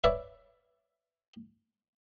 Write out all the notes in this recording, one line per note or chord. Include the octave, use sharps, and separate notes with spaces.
B4 C#5 D5 E5